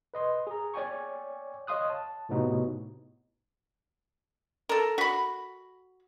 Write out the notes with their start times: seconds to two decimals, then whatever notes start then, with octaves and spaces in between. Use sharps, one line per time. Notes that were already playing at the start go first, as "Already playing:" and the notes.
0.14 B4 D#5 C6
0.47 G#4 A#5
0.74 C#5 D5 G5 G#5 C#6
1.67 C#5 D#5 F5 C6 D#6 F#6
1.90 A5
2.29 A2 C3 B3 D#4 F#4
4.69 A4 A#4
4.98 F#4 B5